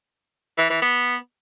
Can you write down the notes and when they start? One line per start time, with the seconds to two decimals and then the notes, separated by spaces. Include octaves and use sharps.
0.58 E3
0.70 E3
0.82 B3